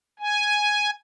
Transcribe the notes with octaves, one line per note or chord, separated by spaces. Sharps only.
G#5